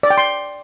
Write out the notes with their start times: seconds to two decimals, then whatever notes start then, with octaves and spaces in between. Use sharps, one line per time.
0.03 D5
0.10 G5
0.18 C6